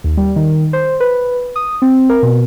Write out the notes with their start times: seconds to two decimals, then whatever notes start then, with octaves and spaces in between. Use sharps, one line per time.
0.04 D#2
0.17 G3
0.36 D#3
0.73 C5
1.00 B4
1.56 D#6
1.82 C4
2.09 A#4
2.23 B2